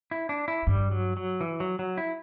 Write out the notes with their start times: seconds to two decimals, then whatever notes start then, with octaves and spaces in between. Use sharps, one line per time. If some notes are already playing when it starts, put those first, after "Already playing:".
0.11 E4
0.29 D4
0.48 E4
0.67 G2 G3
0.91 F#3
1.17 F#3
1.41 E3
1.60 F#3
1.79 F#3
1.98 E4